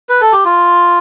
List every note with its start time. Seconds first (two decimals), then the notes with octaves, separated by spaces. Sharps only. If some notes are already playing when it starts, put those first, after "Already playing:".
0.09 B4
0.21 A4
0.32 G4
0.45 F4